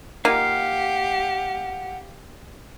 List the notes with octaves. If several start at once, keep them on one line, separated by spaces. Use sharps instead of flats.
A#3 D#4 F4 G4 F5 F#5